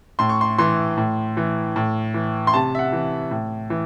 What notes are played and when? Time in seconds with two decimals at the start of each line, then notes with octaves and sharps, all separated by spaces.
0.19 A2 C6
0.29 C#6
0.41 C6
0.58 E3 C6
0.98 A2
1.37 E3
1.76 A2
2.14 E3
2.47 C6
2.54 C3 A5
2.75 E5
2.79 F#5
2.92 E3
3.31 A2
3.70 E3